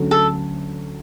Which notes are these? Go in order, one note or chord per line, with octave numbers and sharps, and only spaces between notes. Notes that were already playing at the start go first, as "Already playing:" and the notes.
Already playing: D2 D3 F#3 A3 C#4
A4